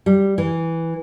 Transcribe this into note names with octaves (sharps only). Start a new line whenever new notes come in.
G3
E3